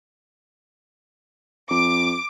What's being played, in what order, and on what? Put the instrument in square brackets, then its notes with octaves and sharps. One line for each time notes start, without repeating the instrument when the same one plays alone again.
[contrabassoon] F2 [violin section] D6